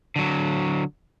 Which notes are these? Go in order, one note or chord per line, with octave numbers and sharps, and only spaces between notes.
D3 F#3